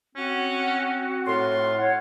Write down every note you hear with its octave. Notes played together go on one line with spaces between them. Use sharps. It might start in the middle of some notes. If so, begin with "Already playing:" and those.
C4 C#4 F#4
A2 F4 C6
C#5 F#5